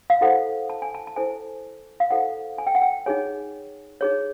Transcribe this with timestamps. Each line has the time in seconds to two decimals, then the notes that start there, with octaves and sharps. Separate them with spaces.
0.10 F5
0.21 E4 A4 C5 F#5
0.70 A5
0.82 G#5
0.94 A5
1.07 A5
1.16 E4 A4 C5 G#5
2.00 F5
2.11 E4 A4 C5 F#5
2.58 G#5
2.67 G5
2.75 F#5
2.82 G5
3.06 D#4 G#4 C#5 G#5
4.01 D#4 G#4 C#5